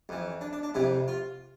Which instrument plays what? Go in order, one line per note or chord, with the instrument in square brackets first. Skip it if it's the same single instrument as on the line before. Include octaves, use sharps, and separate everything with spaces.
[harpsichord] F2 E3
D4
D4
D4
F2 C3 E3 E4
F4